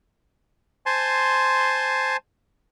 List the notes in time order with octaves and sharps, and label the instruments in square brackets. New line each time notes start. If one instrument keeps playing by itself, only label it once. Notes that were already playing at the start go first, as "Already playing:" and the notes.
[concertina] C5 G#5 A5 C6